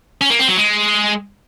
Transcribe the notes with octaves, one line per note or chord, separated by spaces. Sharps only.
C#4
A#3
C4
F#3
G#3